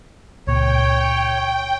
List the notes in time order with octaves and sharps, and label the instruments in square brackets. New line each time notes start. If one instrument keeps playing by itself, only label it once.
[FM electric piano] C#2 A#2 [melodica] C#5 [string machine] G5